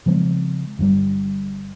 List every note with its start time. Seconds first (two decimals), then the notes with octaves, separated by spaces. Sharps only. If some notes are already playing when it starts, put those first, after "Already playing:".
0.06 C#3 F3 G#3 C4
0.79 G1 G2 B2 G3